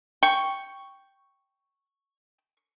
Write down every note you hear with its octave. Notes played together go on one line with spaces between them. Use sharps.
G5 C#6